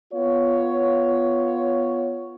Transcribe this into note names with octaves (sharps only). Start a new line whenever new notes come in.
B3 F4 C#5